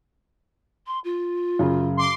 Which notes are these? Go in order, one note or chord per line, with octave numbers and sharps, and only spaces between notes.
C6
F4
F#2 C#3
C6 D6